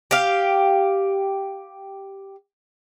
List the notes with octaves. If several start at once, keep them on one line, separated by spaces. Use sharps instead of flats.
G4 F5